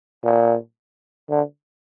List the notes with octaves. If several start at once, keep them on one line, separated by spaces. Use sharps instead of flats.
A#2
D3